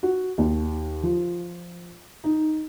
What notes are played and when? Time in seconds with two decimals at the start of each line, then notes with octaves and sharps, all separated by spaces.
0.03 F#4
0.38 D#2
1.03 F3
2.24 D#4